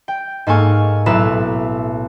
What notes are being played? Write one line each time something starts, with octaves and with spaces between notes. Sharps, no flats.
G5
G#2 A#3 A4 G#5 C#6 F6
B1 A2 E4 B4 A#5 E7